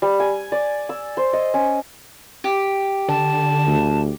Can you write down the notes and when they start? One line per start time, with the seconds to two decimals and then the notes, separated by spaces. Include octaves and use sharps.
0.02 G3
0.20 G#5
0.52 D5
0.89 E6
1.17 C5
1.33 D#5
1.54 C#4
2.44 G4
3.09 D3 A5
3.67 D2